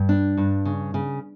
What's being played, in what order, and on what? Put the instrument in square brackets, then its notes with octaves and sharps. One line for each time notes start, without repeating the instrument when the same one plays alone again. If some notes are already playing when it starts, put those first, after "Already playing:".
Already playing: [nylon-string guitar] G2
D4
G2
C#3
C#3